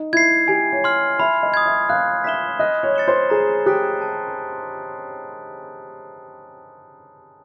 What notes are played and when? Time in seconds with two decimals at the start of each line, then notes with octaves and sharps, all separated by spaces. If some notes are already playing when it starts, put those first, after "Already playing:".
Already playing: D#4
0.13 E4 G#6 C7
0.48 G4 G#5
0.72 C#5
0.84 C6 F6
1.19 E5 B5
1.43 D#5
1.54 D#6 G#6
1.66 E5
1.89 F5 F#6
2.24 E5 B6 E7 G7
2.59 D#5 F#6
2.83 C#5
2.95 A6 C#7 E7 G7
3.08 C5
3.30 G#4 A#5
3.66 G4 D#6 F#6 B6 D7
4.01 A5